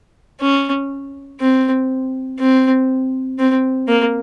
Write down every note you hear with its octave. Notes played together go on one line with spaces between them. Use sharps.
C#4
C4
C4
C4
A#3